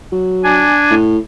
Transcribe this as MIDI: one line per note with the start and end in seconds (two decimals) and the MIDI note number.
0.12 0.67 54
0.44 0.95 62
0.44 0.95 80
0.91 1.18 45